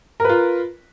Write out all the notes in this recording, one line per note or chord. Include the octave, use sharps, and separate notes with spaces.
F4 A#4 B4